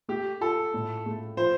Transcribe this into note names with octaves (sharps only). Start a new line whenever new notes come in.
A3 G4
F4 A4
A2
A3
F3 C5